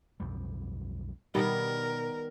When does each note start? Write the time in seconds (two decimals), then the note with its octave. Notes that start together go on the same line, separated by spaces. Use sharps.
0.20 B1 F2 G3
1.35 B2 D#3 G3 B3 A#4